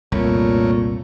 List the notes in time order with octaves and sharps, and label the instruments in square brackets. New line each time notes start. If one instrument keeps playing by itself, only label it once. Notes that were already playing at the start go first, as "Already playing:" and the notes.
[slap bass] C2 [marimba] F2 [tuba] A#2 [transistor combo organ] A3 A#4 C#5